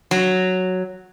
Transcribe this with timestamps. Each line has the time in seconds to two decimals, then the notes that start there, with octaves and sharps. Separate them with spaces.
0.11 F#3